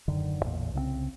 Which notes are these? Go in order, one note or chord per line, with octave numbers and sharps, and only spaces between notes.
D#1 F#2 D3 D#3
A1 E2 A#2
C2 C#3 A3 C4